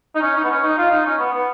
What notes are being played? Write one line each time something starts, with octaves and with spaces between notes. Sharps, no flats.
D#4
C#4
D#4
B3
C#4
D#4
F4
D#4
C#4
B3
B3